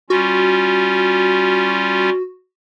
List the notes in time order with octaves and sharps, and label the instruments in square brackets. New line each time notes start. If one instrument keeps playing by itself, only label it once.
[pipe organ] G3 C#4 F4 [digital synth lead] F#4